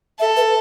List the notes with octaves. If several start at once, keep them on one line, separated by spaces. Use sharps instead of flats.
A4 E5
B4